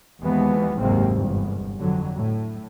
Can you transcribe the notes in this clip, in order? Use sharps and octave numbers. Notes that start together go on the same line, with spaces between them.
D#2 E3 F3 G#3 B3
F#1 D#2 G#2 C3 A#3 C4
G1 E2
F2 D3 F#3
A2